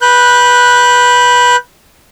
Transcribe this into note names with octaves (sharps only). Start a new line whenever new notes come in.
B4 F#6 G6